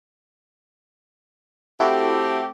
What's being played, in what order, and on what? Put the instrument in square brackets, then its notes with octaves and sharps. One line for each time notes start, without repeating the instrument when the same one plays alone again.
[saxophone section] A3 C4 G4 [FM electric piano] E4 F#4 A4